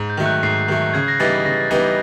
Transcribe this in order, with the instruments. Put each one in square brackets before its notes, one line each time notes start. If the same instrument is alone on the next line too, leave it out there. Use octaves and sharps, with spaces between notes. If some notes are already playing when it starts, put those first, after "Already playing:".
Already playing: [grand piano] G#2
[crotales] G6
[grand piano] D#3 F#3 A3
[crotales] F#6
[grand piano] G#2 [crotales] C7
[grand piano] D#3 F#3 A3
[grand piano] C#3 [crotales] G#6
[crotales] A#6
[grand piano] E3 G3 B3 D#4 [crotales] A6
[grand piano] C#3 [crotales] A#6
[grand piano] E3 G3 B3 D#4 [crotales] A6